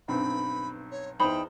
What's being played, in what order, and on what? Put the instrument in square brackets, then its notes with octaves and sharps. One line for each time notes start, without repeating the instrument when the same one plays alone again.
[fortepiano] B1 G2 C4 [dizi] B5
[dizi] C#5
[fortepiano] E2 C5 [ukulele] D#4 B5 [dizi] G5